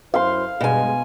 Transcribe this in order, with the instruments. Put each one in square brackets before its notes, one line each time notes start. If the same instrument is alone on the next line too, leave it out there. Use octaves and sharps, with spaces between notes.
[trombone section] F#2 E4 C5 [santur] F5 C6
[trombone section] G2 G#3 [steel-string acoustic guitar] B2 G#5